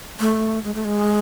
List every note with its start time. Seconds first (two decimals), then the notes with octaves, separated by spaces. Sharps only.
0.20 A3
0.64 G#3
0.74 A3
0.85 G#3